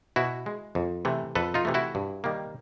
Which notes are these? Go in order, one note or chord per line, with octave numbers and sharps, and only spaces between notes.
B2 E4 F#4
G#3
F2
C3 E3 A3
F2 A4 B4
D#4 F4
C3 E3 A3
E4 F#4
G2
D#3 G3 A#3